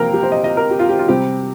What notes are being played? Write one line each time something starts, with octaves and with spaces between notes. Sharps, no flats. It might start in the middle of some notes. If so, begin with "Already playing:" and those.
Already playing: C3 F3 A#3 A#4 F5 G5 A#5
G4
C5
D#5
D#5
A#4
G4
F4
G4
F4
C3 G3 C4 G4